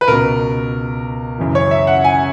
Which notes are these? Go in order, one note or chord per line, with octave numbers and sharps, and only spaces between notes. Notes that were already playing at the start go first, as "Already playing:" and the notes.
B4
C#2 B2 A#4
F#2 C#3 E3
C#5
E5
F#5
G#5